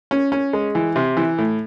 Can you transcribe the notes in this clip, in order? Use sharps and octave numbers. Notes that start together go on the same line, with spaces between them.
C#4
C#4
G#3
E3
C3
E3
A2